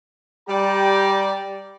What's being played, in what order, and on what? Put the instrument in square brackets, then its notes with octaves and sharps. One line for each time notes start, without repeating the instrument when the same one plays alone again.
[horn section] G3 G4 D5 G5 A#5